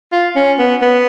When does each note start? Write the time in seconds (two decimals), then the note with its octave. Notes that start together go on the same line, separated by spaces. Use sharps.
0.12 F4
0.36 C#4
0.59 B3
0.82 B3